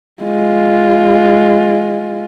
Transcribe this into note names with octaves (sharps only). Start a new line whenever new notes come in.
G#3 F4